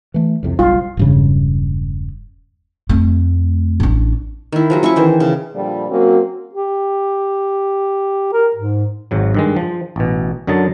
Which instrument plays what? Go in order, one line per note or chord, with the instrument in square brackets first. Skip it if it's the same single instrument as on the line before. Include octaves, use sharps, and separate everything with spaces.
[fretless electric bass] E3 A3
C2 F2 C3
[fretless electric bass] F#1 B1 G3 [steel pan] F4
[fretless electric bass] E1 G2 C#3
[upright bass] F2 A3
A1 D4
[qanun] D#3 E4
F3 F#3 G#4
C#4 E4 G#4 C#6
D#3 E3 C5
C#3
[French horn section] A#2 D3 F3 G3
F#3 A#3 C4 C#4 F#4
[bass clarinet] G4
A#4
G#2
[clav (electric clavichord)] G#1 G#2 F#3
G2 D#3 G#3
F3
A1 B2
F#2 D3 F#3 D#5 A5